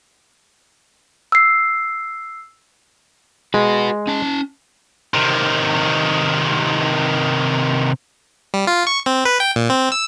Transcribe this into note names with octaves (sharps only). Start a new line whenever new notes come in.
E6 C7
G#3 F#4 B4
C#4 A5
C3 D#3
G3
F4
C#6
C4
B4
G5
A#2
C4
E6